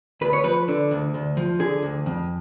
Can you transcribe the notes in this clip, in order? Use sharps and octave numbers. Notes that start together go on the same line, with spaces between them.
D2 B4
C#5
F3 B4
D3
D2
D2
F3
D3 G#4
D2
F2